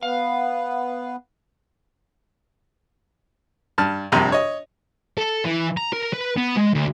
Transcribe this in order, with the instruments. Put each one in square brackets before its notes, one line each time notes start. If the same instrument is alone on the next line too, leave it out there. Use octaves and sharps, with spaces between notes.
[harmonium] B3 B4 [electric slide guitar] F5
[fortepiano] G2 A5 F6
A#1 G2 C3 A#5 C6
C#5 D#5
[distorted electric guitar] A4
E3
A#5
A#4
B4
B3
G#3
D2